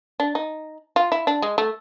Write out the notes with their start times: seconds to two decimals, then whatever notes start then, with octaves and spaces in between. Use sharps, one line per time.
0.20 D4
0.35 D#4
0.96 F4
1.12 E4
1.27 D4
1.42 G#3
1.58 A3